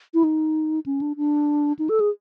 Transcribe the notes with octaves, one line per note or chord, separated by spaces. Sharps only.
E4
D#4
C#4
D4
D4
D#4
A4
G#4